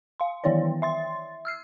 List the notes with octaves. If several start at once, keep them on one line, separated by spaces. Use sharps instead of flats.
F5 C6
D#3 E3 B3 E4 C#5 D5
E5 C6 A6
E6 F6 C7